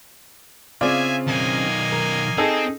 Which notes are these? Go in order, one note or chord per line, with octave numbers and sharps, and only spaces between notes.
C#3 C4 F4 G#4 D5 E5 G#5
B1 D#3 A#3 D#5 G#5
A#4
C4 D#4 G#4 A4